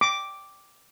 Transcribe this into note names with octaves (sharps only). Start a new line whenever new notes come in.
D6